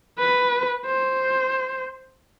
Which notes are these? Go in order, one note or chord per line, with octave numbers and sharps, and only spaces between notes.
B4
C5